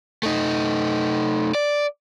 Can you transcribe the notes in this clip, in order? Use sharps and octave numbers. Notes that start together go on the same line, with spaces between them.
A3 D#4
D5